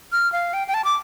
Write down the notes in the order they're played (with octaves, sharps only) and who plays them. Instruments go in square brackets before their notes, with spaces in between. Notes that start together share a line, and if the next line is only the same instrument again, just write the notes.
[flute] F6
F5
G5
G5
A5
D6